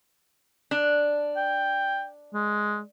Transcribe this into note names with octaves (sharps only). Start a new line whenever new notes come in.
D4
G5
G#3